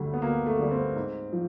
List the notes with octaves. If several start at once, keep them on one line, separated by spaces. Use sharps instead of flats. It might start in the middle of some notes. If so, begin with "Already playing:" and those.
Already playing: D2 D3 G3 A3
B3
D2 A#3
A3
D3 G3
C4
G#2
F3